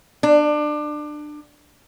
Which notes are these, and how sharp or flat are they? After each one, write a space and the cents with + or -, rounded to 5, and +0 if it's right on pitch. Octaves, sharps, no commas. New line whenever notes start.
D4 +25